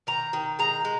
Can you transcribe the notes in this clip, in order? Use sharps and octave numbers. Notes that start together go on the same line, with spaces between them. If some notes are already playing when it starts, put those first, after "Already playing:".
D#3 A#5
D#3
G#3 A#5
G#3